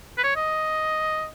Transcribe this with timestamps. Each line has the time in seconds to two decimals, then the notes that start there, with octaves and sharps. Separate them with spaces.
0.18 B4
0.23 C#5
0.36 D#5